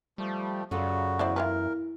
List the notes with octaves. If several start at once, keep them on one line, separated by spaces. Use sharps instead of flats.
F3 G3 A3
F#2 C#3 F4 F#4 A4 D5
E2 E4 C5 D5
E4 F4 A#4 B4